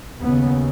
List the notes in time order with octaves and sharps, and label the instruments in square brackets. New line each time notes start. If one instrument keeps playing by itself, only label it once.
[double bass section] D#2 C#3 B3